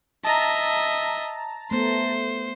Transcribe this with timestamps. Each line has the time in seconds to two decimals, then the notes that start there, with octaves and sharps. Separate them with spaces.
0.24 D#5 E5 A5 A#5
1.71 A3 B3 C5